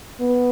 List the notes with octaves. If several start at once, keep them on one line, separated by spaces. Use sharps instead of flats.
B3